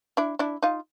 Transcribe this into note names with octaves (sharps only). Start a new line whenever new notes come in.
D4 E4
D4 E4
D#4 F4